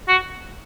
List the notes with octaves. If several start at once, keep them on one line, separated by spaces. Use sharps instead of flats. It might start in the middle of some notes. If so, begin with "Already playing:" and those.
F#4